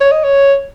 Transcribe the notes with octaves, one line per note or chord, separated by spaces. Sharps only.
C#5
D#5
C#5